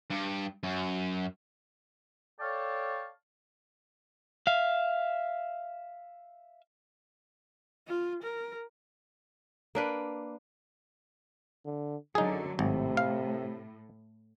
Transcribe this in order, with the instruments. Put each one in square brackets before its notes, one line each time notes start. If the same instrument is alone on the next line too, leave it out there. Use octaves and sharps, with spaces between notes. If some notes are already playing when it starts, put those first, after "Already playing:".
[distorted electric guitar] G2
F#2
[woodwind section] A4 C#5 D5 F5 G5 A5
[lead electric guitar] E5 F5
[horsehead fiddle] F4
A#4
[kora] A#3 D4 B4
[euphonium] D3
[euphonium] F#2 [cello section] D3 F#3 [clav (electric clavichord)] D#4 G#4
[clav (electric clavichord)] G#1 [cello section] A2 [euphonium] C3
[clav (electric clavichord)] F5